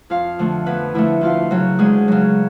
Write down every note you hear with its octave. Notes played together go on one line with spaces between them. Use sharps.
F2 F4 F5
D3 F3 A3
F2 B3 B4
D3 F3 A3 E4 E5
D2 F4 F5
C#3 F#3
D2 G#3 G#4
C#3 F#3